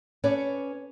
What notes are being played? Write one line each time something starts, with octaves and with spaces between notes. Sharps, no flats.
C#4 A4 B4 C#5 D5